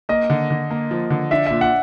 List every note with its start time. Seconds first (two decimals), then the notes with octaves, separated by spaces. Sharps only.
0.09 A#3 D#5
0.30 D3
0.50 D3
0.71 A#3
0.91 F3
1.10 D3
1.31 D4 E5
1.46 A#2 E5
1.61 F#5